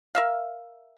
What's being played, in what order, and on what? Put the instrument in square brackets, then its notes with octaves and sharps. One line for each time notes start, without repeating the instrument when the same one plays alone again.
[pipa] A#4 E5 F5